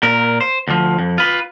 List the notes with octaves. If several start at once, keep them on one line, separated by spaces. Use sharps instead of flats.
A#2 A#4
C5
D2 F3
F2
F4 B4